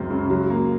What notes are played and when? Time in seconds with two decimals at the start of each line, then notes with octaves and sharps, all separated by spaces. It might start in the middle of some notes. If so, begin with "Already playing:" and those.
Already playing: C#2 F#2 F#3 C4
0.10 C#3
0.30 F#3
0.50 A#3